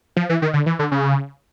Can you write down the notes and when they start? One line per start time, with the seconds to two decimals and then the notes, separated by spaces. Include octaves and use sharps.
0.16 F3
0.29 E3
0.42 D#3
0.53 D3
0.66 E3
0.79 D3
0.92 C#3